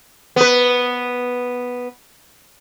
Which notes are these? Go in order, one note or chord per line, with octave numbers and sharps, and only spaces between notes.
B3 B4